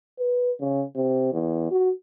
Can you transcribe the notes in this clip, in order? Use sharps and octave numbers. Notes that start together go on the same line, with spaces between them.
B4
C#3
C3
E2
F#4